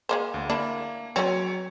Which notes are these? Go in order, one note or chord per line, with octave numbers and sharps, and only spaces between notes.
G#3 A#3 C5
D2
A#3 D4 E4
F#3 C4 C#4 C#5